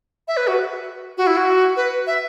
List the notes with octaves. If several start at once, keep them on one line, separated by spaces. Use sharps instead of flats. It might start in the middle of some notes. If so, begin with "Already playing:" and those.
E5
B4
F#4
F#4
E4
F#4
B4
E5